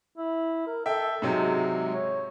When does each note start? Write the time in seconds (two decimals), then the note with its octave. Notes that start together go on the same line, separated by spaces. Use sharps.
0.18 E4
0.67 A#4
0.86 A4 E5 G5
1.22 G#2 C3 F#3 G#3
1.93 C#5